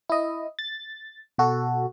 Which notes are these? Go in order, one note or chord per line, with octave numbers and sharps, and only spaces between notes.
E4 D#5
A6
B2 F#4 A4